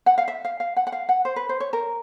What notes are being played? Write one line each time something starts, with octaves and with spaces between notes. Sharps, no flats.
F#5
F5
E5
F5
F5
F#5
F#5
F5
F#5
C5
B4
C5
C#5
A#4